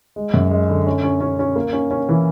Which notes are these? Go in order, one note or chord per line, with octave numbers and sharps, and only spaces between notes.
G#3
F#2
G#3
D3
C#4
C#4
C#4
C#4
A#3
C#4
C#4
E3